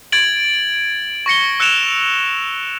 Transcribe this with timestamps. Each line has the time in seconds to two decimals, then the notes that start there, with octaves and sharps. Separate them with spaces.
0.12 G#6 A6 D7 F#7
1.26 C#6 A#6 C#7 G7
1.60 E6 F#6 C#7 D7 E7 F7